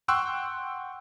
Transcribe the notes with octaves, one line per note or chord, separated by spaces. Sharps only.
F#5 G5 C6 C#6 E6 F#6